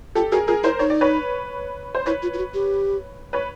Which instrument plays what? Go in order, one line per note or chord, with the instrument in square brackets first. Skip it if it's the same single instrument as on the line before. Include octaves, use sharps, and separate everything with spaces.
[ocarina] F4 [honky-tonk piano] G4 A4
[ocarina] F#4 [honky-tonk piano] G#4 A#4
[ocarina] F4 [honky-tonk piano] G#4 A#4
[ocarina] E4 [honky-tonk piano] A#4 C5
[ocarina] D#4 [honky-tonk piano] C#5
[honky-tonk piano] D5
B4 C#5
C5
[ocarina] E4 [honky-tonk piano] B4 C#5
[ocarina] F4
F4
F#4
G4
[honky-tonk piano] B4 C#5